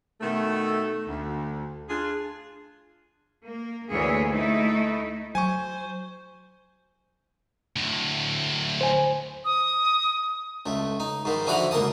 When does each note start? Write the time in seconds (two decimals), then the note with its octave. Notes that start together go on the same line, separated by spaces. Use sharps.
0.21 B2 D#3 A3
1.09 D2
1.89 D4 F4 G#4
3.44 A#3
3.92 D2 E3 A#3 G#4 C#5
4.31 A3 D#4 E4
5.35 F#3 C5 G#5 C#6
7.76 D2 A2
8.81 C5 G#5
9.45 D#6
10.66 C#2 A3
11.00 D#4
11.25 G#2 D#3 E3
11.46 D3 E3 F3 F#4 A#5 B5
11.71 C#2 A#2 A#4 A5 D#6